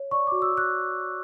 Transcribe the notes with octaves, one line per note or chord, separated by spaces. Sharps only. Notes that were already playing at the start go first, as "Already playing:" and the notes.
Already playing: C#5
D5 C#6
F#4 D6
E6
F#4
F#6